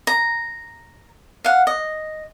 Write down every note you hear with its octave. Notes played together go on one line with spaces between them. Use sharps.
A#5
F5 F#5
D#5